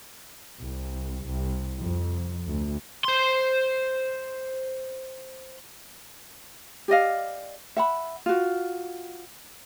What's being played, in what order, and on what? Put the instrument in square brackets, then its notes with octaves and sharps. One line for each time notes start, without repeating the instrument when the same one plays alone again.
[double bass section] C2
C2
F2
D2
[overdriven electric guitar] C5 C6
[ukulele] G4 D5 D#5 F5
E5 F#5 B5
F4 F#4